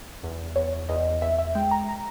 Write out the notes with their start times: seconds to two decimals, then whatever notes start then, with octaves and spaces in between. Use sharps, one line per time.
0.23 E2
0.56 E2 C#5
0.89 E2 D#5
1.22 E2 E5
1.38 E5
1.55 G#3 G5
1.71 A#5
1.88 A#5